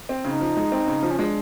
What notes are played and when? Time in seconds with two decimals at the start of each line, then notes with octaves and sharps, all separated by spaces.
0.09 C4
0.24 C#3 D#4
0.41 F3
0.57 G#3
0.72 C4
0.87 C#3
1.03 F3
1.12 C#4
1.18 G#3 D4